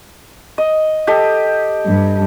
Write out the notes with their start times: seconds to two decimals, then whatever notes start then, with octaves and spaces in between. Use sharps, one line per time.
0.58 D#5
1.07 G4 A4 D#5
1.86 G2